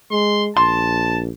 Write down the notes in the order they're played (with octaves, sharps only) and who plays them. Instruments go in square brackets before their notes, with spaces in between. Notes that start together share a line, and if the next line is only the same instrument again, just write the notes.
[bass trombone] G#3 [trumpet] C6
[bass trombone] A#1 [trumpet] A5 [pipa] C6